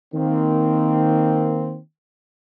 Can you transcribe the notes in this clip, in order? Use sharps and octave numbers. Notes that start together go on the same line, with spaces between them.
D#3 A#3 C4